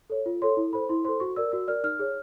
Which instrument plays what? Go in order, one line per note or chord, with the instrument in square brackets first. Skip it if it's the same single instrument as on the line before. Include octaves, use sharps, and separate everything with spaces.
[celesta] A4 C#5
F4
A4 C#5 C6
E4
A4 C5 B5
E4 C6
A4 C5 C6
F#4 C#6
A#4 D5 E6
F#4 E6
A#4 D5 F6
D#4 F6
G#4 C#5